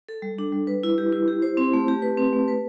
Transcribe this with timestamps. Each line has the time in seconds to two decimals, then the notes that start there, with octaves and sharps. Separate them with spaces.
0.08 A4
0.22 G3
0.38 D4
0.52 G3
0.67 B4
0.83 E4
0.98 G4
1.12 E4
1.28 G4
1.42 C5
1.57 C4
1.73 A3
1.88 G4
2.02 B4
2.18 C4
2.33 A3
2.48 B4